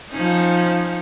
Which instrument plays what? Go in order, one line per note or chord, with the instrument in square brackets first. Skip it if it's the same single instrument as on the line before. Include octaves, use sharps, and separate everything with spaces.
[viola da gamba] F3 C#4 D#4